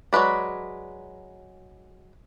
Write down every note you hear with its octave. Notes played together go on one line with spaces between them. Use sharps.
F#3 G#3 B4 D5